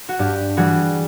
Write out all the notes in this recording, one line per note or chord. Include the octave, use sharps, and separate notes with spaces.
F#4
G2 G4
E3 G3 F#4 G#4